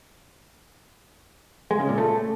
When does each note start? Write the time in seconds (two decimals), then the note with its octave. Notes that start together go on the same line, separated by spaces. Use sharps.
1.71 G#3
1.80 C#3
1.89 A#2
1.98 A3